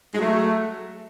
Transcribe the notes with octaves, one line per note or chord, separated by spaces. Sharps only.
G#3
F#3 A3